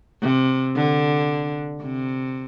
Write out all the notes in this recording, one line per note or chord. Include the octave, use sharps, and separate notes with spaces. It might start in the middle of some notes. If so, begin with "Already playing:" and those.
C3
D3
C3